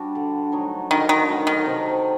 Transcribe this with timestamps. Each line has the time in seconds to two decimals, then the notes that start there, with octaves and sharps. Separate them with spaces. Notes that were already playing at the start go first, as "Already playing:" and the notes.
Already playing: G3 D4 F#4
0.15 D3
0.52 F#3 A3 D#4
0.91 D3 D#3
1.09 D#3
1.28 F#3 A3 D#4
1.47 D#3
1.66 C3